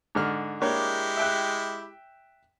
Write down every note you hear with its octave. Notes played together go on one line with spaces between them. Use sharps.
G#2 D3 F6
G#3 A#3 D4 E4 G4 C#5
E5 G5 F#6